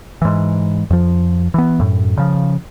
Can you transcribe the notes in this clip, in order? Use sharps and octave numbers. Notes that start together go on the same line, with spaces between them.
G#2 E3
F2 F3
E3 B3
F#2 A2
C#3 F3